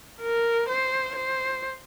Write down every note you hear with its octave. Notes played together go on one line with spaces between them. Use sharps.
A#4
C5
C5